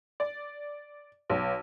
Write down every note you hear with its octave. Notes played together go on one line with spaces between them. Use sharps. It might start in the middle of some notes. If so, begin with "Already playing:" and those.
D5
B1